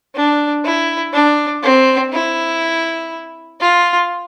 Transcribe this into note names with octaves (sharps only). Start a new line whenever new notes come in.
D4
E4
D4
C4
E4
F4